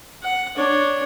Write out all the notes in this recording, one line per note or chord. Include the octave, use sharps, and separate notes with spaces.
F#5
D4 C#5